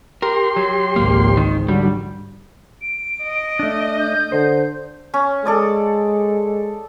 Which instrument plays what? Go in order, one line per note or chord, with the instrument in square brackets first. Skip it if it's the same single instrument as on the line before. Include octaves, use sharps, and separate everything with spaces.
[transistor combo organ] G4 C6 [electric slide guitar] A#4
[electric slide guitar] F#3
[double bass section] G#1 C#2 F3 [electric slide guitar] A#3
[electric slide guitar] D#3
[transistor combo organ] D3 F#3 [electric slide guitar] G3
[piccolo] D7
[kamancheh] D#5
[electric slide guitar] A3 D4
[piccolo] G6
[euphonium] D3 [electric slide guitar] C5
[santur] C#4
[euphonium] G#3 [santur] A4 D5 D#6